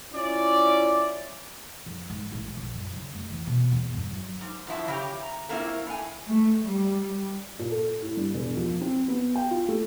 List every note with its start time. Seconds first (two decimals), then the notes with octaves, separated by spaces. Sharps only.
0.13 C#4 E4 F4 D5
1.86 F2
2.10 G#2
2.32 A1
2.57 A#1
2.75 F#2
2.93 C#3
3.14 F1
3.30 E3
3.47 B2
3.72 E2
3.93 G2
4.11 F#3
4.41 G#2
4.67 F#2 F3 E4 A5
4.88 C#3 G4
5.23 A#5
5.49 A3 A#3 C4 C#4 E4 F4
5.86 A2 G#5
6.28 A3
6.67 G3
7.59 A#2
7.71 A4
8.02 A2
8.17 G2
8.34 E1
8.56 F3
8.81 C4
9.08 B3
9.35 G5
9.51 F4
9.68 A3